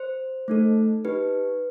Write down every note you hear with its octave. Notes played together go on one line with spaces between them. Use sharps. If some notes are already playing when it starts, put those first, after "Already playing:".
Already playing: C5
A3 D#4 A4
D#4 G4 B4